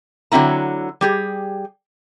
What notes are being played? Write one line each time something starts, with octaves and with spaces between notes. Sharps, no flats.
D3 F#3 C4 E4 A#5
G3 G4 G#4